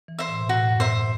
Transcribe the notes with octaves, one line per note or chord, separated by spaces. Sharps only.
E3
C5 E5
A2
B2
A2 F#4
F#2
G2 C5 E5